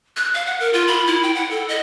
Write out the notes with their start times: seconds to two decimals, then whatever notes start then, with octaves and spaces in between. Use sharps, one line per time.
0.17 F#6
0.34 F5
0.46 F#5
0.60 A#4
0.73 F4
0.88 B5
1.07 E4
1.23 G5
1.35 F#5
1.51 A4
1.69 D#5